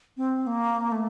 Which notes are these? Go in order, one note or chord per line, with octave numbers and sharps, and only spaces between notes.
C4
A#3
A3